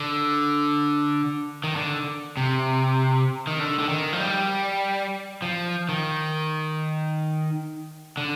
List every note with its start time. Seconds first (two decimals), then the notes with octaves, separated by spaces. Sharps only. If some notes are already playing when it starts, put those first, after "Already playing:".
Already playing: D3
1.64 D#3
1.76 D3
2.37 C3
3.47 D#3
3.59 D3
3.79 D3
3.89 D#3
4.13 F3
4.20 G3
5.42 F3
5.89 D#3
8.17 D3